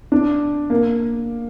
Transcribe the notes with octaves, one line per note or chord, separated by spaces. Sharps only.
D4
A#3